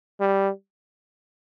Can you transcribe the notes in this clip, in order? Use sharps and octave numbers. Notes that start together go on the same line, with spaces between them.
G3